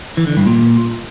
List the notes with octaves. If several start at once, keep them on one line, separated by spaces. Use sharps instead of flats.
E3
D3
G2
A#2